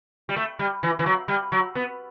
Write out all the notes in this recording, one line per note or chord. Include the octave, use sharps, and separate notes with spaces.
G3
A3
G3
E3
E3
F#3
G3
F#3
B3